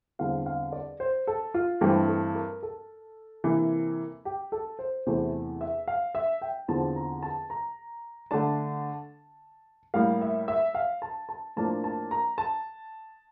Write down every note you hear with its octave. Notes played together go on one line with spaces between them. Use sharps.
E2 D3 G3 C4 F5
F5
D5
C5
A4
F4
G2 E3 A3 C4 G4
A4
A#4
A4
C3 E3 A#3
G4
A4
C5
E2 C3 E3 A3 C5
E5
F5
E5
G5
E2 D3 F3 C4 A5
A#5
A5
A#5
D3 A3 D4 A5
A2 G3 A#3 F5
E5
E5
F5
A5
A5
A2 F3 A#3 D4 A5
A5
A#5
A5